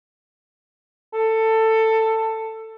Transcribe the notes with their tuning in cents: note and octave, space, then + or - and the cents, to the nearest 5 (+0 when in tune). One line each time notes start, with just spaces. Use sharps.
A4 +15